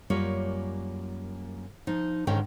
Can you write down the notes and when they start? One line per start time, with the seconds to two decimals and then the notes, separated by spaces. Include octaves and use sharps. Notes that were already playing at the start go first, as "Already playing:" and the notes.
0.10 F#2 G3 A#3 F4 C#5
1.87 F3 D#4
2.27 G#2 D3 D#3 C#4 A#4 G5